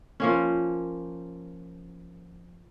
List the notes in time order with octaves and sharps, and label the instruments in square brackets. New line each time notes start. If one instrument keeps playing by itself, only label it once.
[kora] F3 A#3 C#4